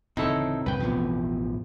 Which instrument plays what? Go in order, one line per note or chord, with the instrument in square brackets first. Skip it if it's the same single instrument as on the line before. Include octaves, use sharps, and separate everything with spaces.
[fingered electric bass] D1 C#3 E3 [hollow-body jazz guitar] C4 C#5 [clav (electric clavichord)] D#4 E4 A4
[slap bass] C2 G2 [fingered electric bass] G#3 [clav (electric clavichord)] B4 G5
[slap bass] A1 E2 F3 [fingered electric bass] B2 B3